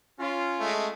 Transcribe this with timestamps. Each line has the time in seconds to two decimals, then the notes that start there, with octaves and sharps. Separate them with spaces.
0.19 C#4 F4
0.60 G#3 A3